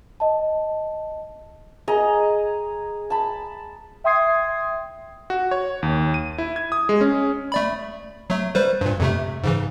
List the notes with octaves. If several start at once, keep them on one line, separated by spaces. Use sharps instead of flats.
D#5 A5
G#4 D#5 A#5
A5 B5
E5 G5 C6 D#6 G#6 C7
F#4
C#5
D#2
D#7
E4
G#6
D#6
G#3
C#4
A3 D5 B5
F#3 A3
G3 B4 C5
G2 A#2
F2 C3 A3
G#2 C#3 E3